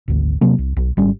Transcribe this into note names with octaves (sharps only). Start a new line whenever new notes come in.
G#1 D2
C3 F#3 A#3
C2
B1
G#1 G3 C#4